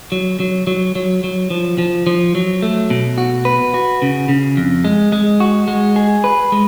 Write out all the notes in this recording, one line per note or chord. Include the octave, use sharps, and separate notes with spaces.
F#3
F#3
F#3
F#3
F#3
F3
F3
F3
F#3
A3
B2
F#4
B4
F#4
C#3
C#3
F2
G#3
G#3
F#4
G#3
G#4
B4
G#3